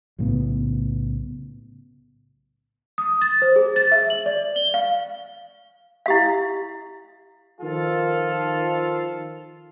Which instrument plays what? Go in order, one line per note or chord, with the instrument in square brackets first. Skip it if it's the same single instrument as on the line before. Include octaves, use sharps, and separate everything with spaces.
[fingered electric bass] B1 A2 C#3 B3
[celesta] D#6
A6
C5
G#4
A6
E5
F#7
D5
G7
F5
[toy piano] E4 G4 F5
[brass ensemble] D#3 F3 F4 A4